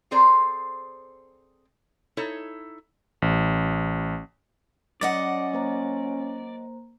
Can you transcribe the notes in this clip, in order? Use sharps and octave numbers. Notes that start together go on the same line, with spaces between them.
C4 G#4 A4 C5 D5 A#5
D#4 E4 A4 C#5
A1
F#3 C#4 D5 D#5 F#5
A#3 C5 A#5